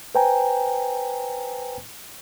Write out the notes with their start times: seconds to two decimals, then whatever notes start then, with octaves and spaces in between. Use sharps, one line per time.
0.15 B4 C5 G5 G#5 A#5